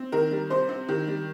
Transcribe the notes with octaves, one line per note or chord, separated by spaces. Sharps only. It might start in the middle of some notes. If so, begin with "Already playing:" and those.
Already playing: C4
D#3 A#4
G3
C3 C5
C4
D#3 G4
G3